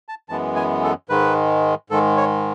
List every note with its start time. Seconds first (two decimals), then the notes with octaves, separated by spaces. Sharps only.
0.09 A5
0.29 F#2 E3 G#3 B3 A5
0.56 G#5
0.84 A4
1.09 G#2 D#3 G#3 B4
1.90 G#2 D#3 G#3 A4
2.17 C#5